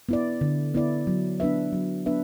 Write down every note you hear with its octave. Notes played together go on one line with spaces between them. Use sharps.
B3 E4 D5
D3
B3 E4 D5
F#3
B3 D4 B4 E5
F#3
B3 D4 B4 E5